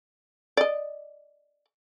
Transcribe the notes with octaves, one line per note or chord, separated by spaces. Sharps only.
D5 D#5